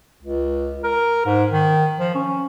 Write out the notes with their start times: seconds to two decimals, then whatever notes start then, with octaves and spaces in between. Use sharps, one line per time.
0.23 C#2
0.84 A#4
1.26 G#2
1.52 D#3
1.98 F3
2.15 C#4